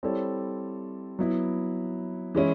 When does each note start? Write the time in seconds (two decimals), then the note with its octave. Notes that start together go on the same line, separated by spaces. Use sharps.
0.03 G3 C4 E4 A4 C#5
1.19 F#3 B3 E4
2.35 E3 G#3 C#4 E4